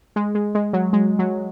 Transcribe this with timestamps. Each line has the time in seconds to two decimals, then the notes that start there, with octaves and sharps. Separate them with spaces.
0.16 G#3
0.35 G#3
0.55 G#3
0.73 F#3
0.93 G#3
1.19 F#3